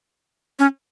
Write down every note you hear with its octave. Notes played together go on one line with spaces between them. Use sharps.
C#4